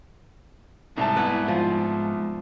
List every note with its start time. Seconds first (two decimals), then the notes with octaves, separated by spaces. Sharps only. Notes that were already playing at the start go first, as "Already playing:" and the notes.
0.97 C2 G#2 A5
1.16 B3 E4 B4
1.48 F3